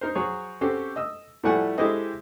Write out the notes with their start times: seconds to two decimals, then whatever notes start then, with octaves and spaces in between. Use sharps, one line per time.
0.01 D#4 A#4 C5
0.15 F#3 F#4 G#4 C5 C#5
0.61 C4 C#4 F#4 G4 A4 C5
0.96 D#5 E6
1.43 A2 F3 G3 A3 F#5 G#5
1.78 G#3 E4 G4 A4 C5 D#5